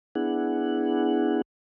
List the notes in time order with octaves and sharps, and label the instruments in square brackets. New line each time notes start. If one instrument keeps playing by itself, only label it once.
[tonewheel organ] B3 D4 E4 G#4 F#5